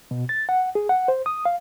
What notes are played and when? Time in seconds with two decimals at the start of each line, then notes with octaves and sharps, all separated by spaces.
0.11 B2
0.29 A6
0.49 F#5
0.75 G#4
0.89 F#5
1.08 C5
1.26 D#6
1.45 F5